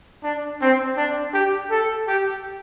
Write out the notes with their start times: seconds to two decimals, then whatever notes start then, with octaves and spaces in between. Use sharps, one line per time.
0.24 D4
0.61 C4
0.97 D4
1.33 G4
1.71 A4
2.07 G4